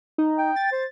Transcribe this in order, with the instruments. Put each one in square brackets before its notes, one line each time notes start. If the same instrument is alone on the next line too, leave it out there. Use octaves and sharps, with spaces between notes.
[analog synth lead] D#4
[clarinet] G5
[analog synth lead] A6
[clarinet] C5